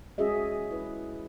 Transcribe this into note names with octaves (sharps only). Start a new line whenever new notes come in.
G#3 C#4 F#4 G#4 D#5 E5
E4 B4